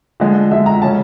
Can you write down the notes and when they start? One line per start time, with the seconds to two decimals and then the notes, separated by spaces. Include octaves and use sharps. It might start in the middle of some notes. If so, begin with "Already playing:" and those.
0.20 D3 F3 G#3
0.51 D3 F3 G#3 E5
0.66 A#5
0.82 C#3 F3 G#3 C#4 A5